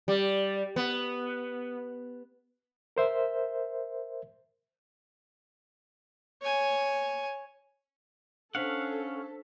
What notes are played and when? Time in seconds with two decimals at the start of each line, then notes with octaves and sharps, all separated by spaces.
0.08 G3
0.76 B3
2.97 A#4 C5 E5
6.42 C#5 G#5
8.55 C#4 D4 A4 C5 F5 F#5 B6